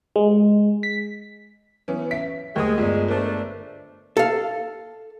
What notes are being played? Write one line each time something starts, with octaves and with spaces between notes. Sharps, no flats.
G#3
B6
E3 B3 C#4
E5 B6
D#2 D3 G#3 A3 A#4 D#6
G1 F4 D5
A3 D4 A#4 C5
A4 F5